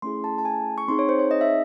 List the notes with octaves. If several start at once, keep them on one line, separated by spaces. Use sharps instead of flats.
A3 C#4 E4 G#4 C6
A5
A5
G#5
C#6
C4 D#4 G#4 C6
C#5
C5
C#5
D#5
E5